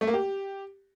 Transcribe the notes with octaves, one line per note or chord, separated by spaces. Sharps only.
A3
A#3
G4